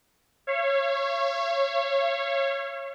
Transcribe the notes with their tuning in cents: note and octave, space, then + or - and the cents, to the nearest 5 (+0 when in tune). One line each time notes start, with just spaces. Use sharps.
C#5 -15 F5 -45